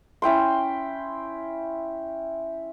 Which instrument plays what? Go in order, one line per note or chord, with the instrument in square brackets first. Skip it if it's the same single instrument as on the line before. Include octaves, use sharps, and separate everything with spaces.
[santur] C#4 E4 G5 C6